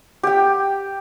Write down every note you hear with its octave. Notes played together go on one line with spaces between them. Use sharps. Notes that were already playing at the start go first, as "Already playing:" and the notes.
G4 G5